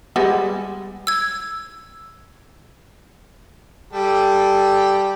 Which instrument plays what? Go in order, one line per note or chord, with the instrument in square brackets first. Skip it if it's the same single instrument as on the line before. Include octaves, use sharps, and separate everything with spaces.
[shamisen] G3 G#3 B3
[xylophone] E6 G#6
[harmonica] G3 G4 A4